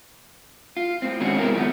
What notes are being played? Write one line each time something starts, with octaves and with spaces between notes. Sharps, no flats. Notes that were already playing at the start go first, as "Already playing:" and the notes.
F4
A2 C4
G#2 D3 D#3 C#4 F#4 G#4
C3 G#3 B3 C4 E4 A#4
D#3 F3 G3 A3 B3